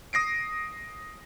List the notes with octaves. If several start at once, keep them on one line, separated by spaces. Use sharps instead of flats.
D#6 A#6 C7 D7